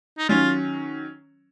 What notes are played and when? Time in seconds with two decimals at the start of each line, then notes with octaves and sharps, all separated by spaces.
0.18 D#4
0.28 D#3 F#3 C#4 F4